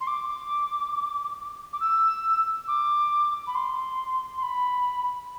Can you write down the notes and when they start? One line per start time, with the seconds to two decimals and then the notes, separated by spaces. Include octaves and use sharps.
0.01 C6
0.07 D6
1.73 D6
1.80 E6
2.68 D6
3.47 B5
3.55 C6
4.38 C6
4.43 B5